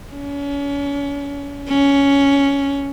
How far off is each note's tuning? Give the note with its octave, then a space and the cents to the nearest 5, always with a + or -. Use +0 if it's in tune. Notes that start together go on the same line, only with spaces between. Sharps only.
C#4 +35
C#4 +10